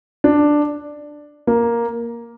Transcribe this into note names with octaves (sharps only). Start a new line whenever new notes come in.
D4
A#3